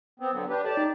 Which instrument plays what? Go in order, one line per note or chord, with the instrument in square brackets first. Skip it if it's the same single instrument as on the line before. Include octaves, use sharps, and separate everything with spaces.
[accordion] B3 C4
D3 F#3 B3
D4 G4 B4
[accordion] G4 D5 A5 [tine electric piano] A4 C#5
[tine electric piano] D#4